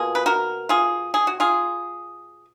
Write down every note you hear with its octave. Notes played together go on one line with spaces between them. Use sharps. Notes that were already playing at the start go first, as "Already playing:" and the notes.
Already playing: B2 A#3 F4 G#4
B4
F#4 A#4
F4 G#4
G#4
F#4
F4 G#4